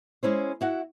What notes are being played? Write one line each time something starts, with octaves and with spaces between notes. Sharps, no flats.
G#3 C#4 E4 C5
E4 F#4 F#5